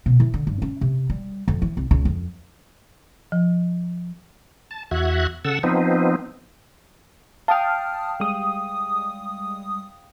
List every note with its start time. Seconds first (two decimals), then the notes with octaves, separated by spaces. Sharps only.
0.06 B2
0.20 E3
0.34 D3
0.47 G2
0.62 C#4
0.81 C3
1.10 G3
1.48 F2
1.62 E3
1.77 C2
1.91 C#2
2.05 F2
3.32 F3
4.71 A5
4.91 E2 F#4 E5 F#6 G#6
5.45 C#3 A4 F#5 E6
5.63 F3 B3 C4 D#4
7.48 F5 G5 A5 D#6 F6
8.20 G3 G#3 D#6